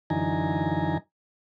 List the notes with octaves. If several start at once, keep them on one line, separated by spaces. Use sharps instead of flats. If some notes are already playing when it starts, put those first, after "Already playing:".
F#2 D3 E3 D#4 G#5 A#5